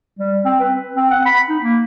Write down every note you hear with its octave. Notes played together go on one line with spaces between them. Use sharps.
G3
C4
B4
C4
F#5
B5
D#4
A#3